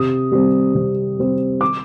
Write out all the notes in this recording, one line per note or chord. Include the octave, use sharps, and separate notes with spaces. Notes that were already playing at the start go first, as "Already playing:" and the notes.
Already playing: C3 D#6
G3 C4
C3
G3 C4
D6